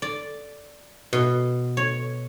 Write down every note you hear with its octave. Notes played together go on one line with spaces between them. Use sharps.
D5
B2
C#5